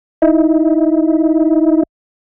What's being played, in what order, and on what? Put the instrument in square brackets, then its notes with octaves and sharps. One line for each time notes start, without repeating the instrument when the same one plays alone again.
[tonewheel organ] D#4 E4